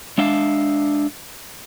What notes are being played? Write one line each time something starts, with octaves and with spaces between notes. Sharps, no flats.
G#3 D4 E5 F5